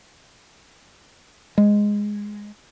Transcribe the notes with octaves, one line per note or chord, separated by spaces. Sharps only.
G#3